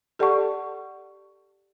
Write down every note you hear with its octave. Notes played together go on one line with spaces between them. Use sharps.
G4 A4 D5 F#5 A5 C#6